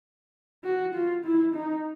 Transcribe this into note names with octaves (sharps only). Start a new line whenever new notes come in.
F#4
F4
E4
D#4